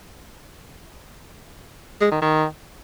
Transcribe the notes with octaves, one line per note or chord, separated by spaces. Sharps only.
G#3
D#3
D#3